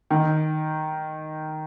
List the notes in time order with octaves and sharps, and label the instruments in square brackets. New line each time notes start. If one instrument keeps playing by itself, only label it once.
[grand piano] D#3